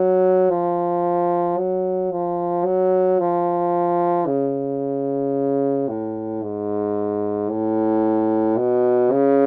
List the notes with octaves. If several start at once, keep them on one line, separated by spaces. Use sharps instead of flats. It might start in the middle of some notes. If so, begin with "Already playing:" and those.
Already playing: F#3
F3
F#3
F3
F#3
F3
C#3
A2
G#2
A2
B2
C#3